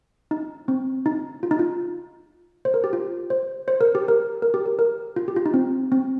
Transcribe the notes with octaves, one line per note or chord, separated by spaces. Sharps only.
D#4
C4
D#4
F4
D#4
F4
C5
A#4
G4
F4
C5
C5
A#4
G4
A#4
A#4
G4
A#4
A#4
F4
G4
F4
D#4
C4
C4